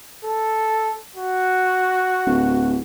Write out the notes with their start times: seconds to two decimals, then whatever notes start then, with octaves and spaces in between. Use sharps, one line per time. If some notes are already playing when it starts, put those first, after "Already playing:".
0.24 A4
1.16 F#4
2.26 D1